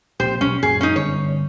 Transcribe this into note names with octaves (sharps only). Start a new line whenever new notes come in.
A#1 C3 G4 C5
B1 C#4
F#2 A#2 F#3 G#4
C#4 D#4
G1 C#5